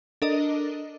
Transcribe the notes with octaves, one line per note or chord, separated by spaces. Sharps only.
D4 A4 A#4 D#5